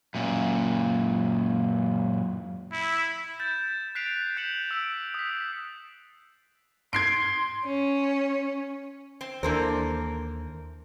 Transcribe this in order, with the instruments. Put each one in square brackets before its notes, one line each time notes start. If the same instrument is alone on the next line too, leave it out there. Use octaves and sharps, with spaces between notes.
[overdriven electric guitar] F#2 A#2
[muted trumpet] E4
[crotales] G6 A6 E7
F#6 B6 C7 D7 F7
G6 C#7 E7 F#7
E6 B6 D7
D#6 B6
[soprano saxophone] C6 [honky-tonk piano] G#6 C7 D7
[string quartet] C#4
[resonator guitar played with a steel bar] C4
[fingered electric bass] D#2 [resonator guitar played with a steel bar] E3 A#3 A#4 [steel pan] D4 A4 C5